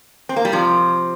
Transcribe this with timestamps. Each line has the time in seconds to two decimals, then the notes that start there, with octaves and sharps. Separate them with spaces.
0.29 C4
0.36 A#3
0.45 G3
0.53 C3 F3